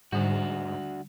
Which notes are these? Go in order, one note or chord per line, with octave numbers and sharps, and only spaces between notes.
G#2 D3 G3 D4 F#4